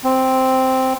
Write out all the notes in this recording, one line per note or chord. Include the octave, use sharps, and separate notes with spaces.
C4